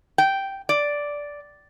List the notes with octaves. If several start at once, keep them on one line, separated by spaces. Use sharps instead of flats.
G5
D5